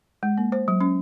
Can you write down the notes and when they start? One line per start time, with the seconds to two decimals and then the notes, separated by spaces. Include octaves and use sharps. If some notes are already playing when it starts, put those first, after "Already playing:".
0.23 G#3
0.38 A#3
0.52 C5
0.68 F#3
0.81 C#4